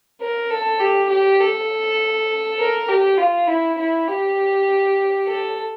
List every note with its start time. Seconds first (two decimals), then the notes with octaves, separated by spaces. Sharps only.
0.21 A#4
0.51 A4
0.80 G4
1.09 G4
1.40 A4
2.59 A#4
2.89 G4
3.18 F4
3.48 E4
3.78 E4
4.08 G4
5.27 A4